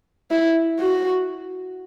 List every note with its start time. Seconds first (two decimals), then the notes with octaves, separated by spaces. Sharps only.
0.31 E4
0.80 F#4